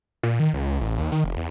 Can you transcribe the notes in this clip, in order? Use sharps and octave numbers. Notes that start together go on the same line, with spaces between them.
A#2
D#3
C#2
A1
D#2
D#3
F1
E2